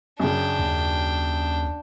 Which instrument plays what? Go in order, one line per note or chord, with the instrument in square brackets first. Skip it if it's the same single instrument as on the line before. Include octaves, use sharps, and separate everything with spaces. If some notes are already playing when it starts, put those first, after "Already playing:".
[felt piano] F#2 C#3 [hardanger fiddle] D4 G5
[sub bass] D#2